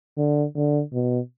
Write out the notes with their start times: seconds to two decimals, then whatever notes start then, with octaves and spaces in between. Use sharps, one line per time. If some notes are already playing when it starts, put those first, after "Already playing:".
0.18 D3
0.55 D3
0.93 B2